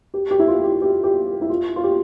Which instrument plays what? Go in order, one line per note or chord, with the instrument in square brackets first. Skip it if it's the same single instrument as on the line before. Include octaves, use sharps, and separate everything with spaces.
[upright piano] G4
G4
E4
F4
G4
G4
G4
E4
F4
F4
G4